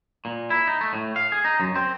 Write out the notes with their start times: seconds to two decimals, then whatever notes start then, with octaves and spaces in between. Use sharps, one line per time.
0.25 A#2
0.50 E4
0.67 D#4
0.81 A3
0.93 A2
1.16 F5
1.32 G#4
1.45 D#4
1.60 F#2
1.76 C4